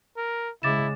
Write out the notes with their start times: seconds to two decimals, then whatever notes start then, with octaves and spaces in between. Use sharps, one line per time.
0.17 A#4
0.63 C#3 G#3 E4 D6 A6 E7